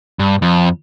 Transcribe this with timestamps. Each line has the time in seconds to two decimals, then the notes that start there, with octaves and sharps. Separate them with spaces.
0.19 G2
0.42 F2